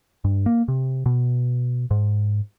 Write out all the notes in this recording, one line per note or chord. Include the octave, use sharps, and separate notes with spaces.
G2
A#3
C3
B2
G#2